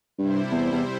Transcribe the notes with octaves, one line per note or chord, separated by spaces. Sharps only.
G2 C3 G3 E4 C5
E2
E2